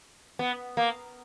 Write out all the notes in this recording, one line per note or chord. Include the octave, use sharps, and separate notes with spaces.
B3
A#3